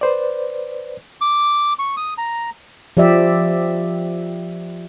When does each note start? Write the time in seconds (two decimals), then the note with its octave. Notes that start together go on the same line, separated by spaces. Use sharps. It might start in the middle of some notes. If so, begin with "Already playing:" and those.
0.01 B4 C5 D5
1.21 D6
1.79 C#6
1.97 D#6
2.18 A#5
2.97 F3 G4 D5 E5